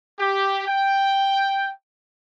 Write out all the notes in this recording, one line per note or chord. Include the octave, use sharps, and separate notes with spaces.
G4
G5